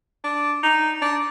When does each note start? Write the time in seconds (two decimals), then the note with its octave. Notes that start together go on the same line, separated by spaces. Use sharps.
0.24 D4
0.63 D#4
1.02 D4